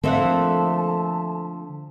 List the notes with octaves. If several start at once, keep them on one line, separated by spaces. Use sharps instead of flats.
D3 F3 A3 A#3 C4 E5 F#5 A5